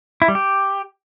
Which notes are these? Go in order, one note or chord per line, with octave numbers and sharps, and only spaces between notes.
E4
G3
G4